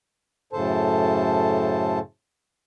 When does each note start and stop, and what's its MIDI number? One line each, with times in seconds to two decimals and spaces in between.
0.53 1.99 42
0.53 1.99 45
0.53 1.99 49
0.53 1.99 69
0.53 1.99 72
0.53 1.99 81